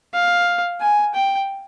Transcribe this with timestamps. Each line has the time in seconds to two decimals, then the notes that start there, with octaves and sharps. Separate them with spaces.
0.14 F5
0.81 G#5
1.14 G5